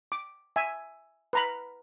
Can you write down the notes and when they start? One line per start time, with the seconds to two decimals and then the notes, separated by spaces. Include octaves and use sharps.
0.12 D6
0.56 E5 G#5
1.33 B4 A#5 B5